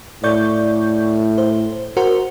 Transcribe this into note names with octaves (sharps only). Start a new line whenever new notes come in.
A2 D5 C#6 G6
C5
F#4 A#4 C5